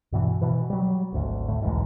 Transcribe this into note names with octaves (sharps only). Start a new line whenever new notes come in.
G2 B2 E3
B2 E3
F#3 G3
G#1 D2
A2
B1 E2 G#2